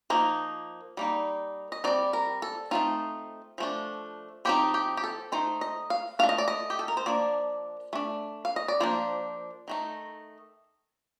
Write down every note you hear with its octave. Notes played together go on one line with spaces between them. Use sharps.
F3 A#3 D#4
G3 A#3 D#4
D#5
G3 C4 D#4 D5
A#4
A4
A3 C4 D#4 F4
F3 A3 D4
F3 C4 D#4 G4
G4
G4
A4
D#3 A3 D#4 C5
D#5
F5
A3 D4 F5
D#5
D5
D#5
G4
A4
A#4
C5
F3 A#3 D4 D5
A3 D4
F5
D#5
D5
F3 A#3 D4 C5
D#3 A3 D#4